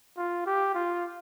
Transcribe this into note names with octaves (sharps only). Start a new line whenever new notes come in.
F4
G4
F4